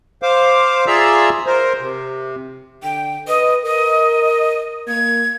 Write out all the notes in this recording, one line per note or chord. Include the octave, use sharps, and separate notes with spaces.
C5 F5 D6
F4 G#4 D5 E5 A#5 E6
A#4 C5
C3
D3 G5
B4 D#5
A#4 D#5
A#3 G#6